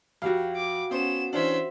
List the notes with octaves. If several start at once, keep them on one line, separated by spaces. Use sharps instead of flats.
F2 F#4 G4 F5
D6
B3 C#4 C5 E7
E3 C#4 D4 C5 E5